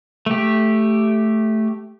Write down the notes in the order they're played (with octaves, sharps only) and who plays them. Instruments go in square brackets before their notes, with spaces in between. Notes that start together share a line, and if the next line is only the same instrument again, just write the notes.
[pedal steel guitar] A3 G4